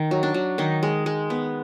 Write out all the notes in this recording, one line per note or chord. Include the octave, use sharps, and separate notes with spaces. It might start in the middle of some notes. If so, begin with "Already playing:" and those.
Already playing: D#3
F#3
D4
F#3
D#3 D#4
G#3
G#3
B3